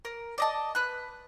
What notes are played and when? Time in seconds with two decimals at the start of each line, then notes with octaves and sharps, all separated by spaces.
0.05 A#4
0.38 D5 D#5 A5
0.75 B4 F#6